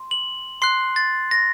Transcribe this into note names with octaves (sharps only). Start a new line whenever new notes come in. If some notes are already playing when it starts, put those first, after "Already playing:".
Already playing: C6
F#7
C6 F#6 C7
A6
A#6